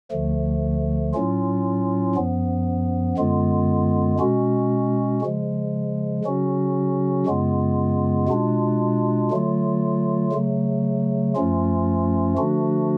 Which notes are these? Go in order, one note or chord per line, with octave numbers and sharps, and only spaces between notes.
D2 D3 F3 A3
A2 F#3 C#4 F4
F#2 F3 B3
F#2 D3 G#3 B3 F4
B2 G#3 C#4 F#4
C#3 F3 G#3
C#3 F#3 C#4 F#4
F#2 C#3 G#3 B3 F4
B2 G#3 D4 F4
D3 F#3 A3 F4
C#3 F#3 A3
F#2 F3 A3 C#4 F4
D3 F3 A3 D4 F#4